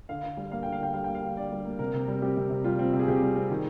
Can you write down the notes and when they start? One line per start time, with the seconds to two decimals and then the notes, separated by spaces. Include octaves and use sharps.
0.09 D3 F5
0.23 D3
0.37 G3
0.51 A#3 F5
0.63 D3 G5
0.72 F5
0.80 D3 G5
0.93 G3 F5
1.04 A#3 G5
1.15 F5
1.23 D3
1.37 D3 D5
1.52 G3
1.65 A#3
1.79 C3 A#4
1.94 C3
2.08 G3
2.22 C4 G4
2.37 C3
2.50 C3
2.64 G3 F4
2.79 C4
2.93 C3
2.99 G#4
3.08 C3 G4
3.22 G3
3.36 C4
3.50 D#3 G#4